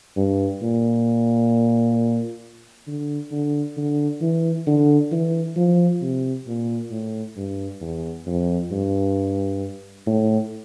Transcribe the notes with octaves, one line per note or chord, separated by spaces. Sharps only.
G2
A#2
D3
D3
D3
E3
D3
E3
F3
C3
A#2
A2
G2
E2
F2
G2
A2